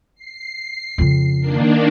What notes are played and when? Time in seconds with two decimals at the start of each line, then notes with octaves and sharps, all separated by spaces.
0.15 C7
0.98 F2 C#3
1.40 D#3 A#3 D4